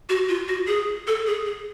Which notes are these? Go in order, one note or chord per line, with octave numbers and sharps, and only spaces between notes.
F#4
F4
F#4
G#4
A4
G#4
G#4